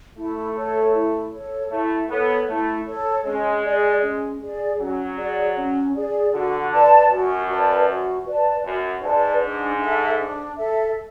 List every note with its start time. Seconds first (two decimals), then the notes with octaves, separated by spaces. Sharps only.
0.17 A3 E4
0.56 A4 C#5
0.94 E4
1.33 A4 C#5
1.71 A3 E4
2.10 B3 A4 C#5
2.48 A3 E4
2.86 A4 C#5
3.25 G#3 C#4
3.65 G#4 D5
4.02 C#4
4.42 G#4 D5
4.80 F#3 C#4
5.18 G#4 D5
5.56 C#4
5.95 G#4 D5
6.34 D3 F#4
6.73 B4 D5 A5
7.10 F#2 F#4
7.49 B4 D5 A5
7.87 F#4
8.26 B4 D5 A5
8.65 F#2 F#4
9.03 G#2 B4 D5 A5
9.42 D4
9.81 A4 E5
10.19 D4
10.57 A4 E5